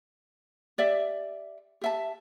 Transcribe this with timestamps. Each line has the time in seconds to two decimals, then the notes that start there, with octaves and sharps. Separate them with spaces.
0.78 G4 D5 E5
1.81 G4 E5 A5